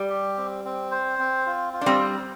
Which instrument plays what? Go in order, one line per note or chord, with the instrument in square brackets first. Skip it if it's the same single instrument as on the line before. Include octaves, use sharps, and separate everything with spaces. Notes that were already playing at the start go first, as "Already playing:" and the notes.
Already playing: [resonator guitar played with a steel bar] G3
[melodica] G4
C4
C4
C5
C4
F4
F4
[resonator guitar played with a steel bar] D4
G3 C4
[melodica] C5